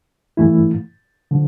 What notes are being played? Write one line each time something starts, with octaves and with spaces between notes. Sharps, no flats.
G2 E3 A3 E4
D3 F3